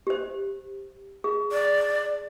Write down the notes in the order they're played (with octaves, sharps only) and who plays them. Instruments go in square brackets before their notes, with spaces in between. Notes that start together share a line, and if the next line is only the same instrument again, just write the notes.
[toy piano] G4 C5
G#4
[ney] D5